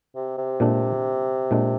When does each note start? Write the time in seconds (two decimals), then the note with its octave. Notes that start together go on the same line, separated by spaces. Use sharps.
0.15 C3
0.38 C3
0.60 A#2 G#3 D4
1.51 A#2 G#3 D4